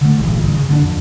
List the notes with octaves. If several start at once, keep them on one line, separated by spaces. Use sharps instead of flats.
D3 A3
D#1 G#1 G2 E3
G1 G2
C#3
D3 B3 D4
F2